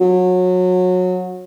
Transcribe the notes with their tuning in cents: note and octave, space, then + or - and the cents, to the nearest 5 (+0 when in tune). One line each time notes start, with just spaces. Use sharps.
F#3 -25